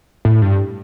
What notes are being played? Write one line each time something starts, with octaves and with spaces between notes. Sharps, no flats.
A2
G2